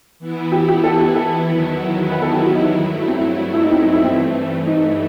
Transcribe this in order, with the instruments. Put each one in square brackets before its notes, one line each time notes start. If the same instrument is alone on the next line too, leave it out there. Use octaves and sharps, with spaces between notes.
[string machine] E3 B3 E4
[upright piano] G4
G4
A4
G4
A4
[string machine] E2 D#3 F#3 B3 E4
[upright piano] B4
A4
G4
F#4
D#4
E4
[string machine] G2 F#3 A3 E4
[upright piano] C4
E4
D#4
C4
D#4
E4
[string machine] G2 E3 A3 [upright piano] C4
[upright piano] D#4